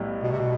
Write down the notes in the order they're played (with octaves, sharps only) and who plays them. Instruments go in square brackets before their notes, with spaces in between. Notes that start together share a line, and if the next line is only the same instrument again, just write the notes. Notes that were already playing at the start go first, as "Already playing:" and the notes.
Already playing: [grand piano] B1 A2 G3 B3
[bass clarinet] B2
C3
B2